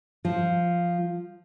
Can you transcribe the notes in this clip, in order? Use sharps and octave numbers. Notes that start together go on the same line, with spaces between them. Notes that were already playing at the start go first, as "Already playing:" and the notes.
F3